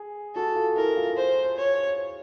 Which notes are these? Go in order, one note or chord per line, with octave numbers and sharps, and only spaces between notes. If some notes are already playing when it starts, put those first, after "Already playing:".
Already playing: G#4
F#4 A4
F4
E4 A#4
F4
C5
C#5